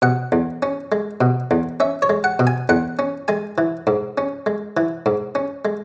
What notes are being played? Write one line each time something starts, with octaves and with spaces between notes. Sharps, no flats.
B2 F#5
E2
C#4
G#3
B2
E2
C#4 E5
C#5
G#3
F#5
B2
G#5
E2 F#5
C#4
G#3 G#5
E3
G#2
C#4
G#3
E3
G#2
C#4
G#3